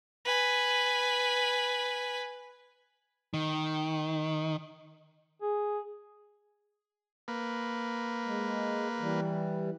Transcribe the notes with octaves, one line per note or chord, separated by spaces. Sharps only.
B4 G#5
D#3
G#4
A#3 B4
G#3
E3 G3